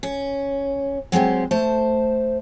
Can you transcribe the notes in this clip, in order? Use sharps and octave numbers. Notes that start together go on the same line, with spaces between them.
C#4
F#3 G#3 C4 G4
A3 C5 A5